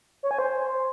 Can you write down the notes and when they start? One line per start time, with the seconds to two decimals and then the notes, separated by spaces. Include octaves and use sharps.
0.23 C#5
0.31 G#5
0.39 C5